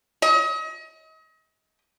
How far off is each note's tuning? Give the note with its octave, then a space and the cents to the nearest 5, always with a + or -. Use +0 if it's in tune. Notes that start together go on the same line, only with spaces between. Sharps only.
D#5 +35